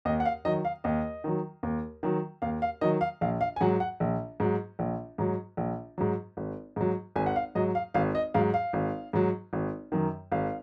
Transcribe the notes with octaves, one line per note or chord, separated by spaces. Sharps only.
D#2 D#5
F#5
F5
D#3 F#3 D#5
F5
D#2 D#5
D#3 F#3
D#2
D#3 F#3
D#2 F5
F5
D#3 F#3 D#5
F5
A#1 F5
F5
G#5
G#2 F#3 F#5
F#5
A#1
G#2 F#3
A#1
G#2 F#3
A#1
G#2 F#3
G#1
G#2 F#3
G#1 G#5
F#5
F5
G#2 F#3 D#5
F5
G#1 F5
D#5
G#2 F#3 F5
F5
G#1
G#2 F#3
G#1
F#2 D#3
G#1 F5